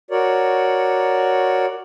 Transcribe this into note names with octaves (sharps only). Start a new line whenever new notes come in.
F#4 A#4 C#5 D5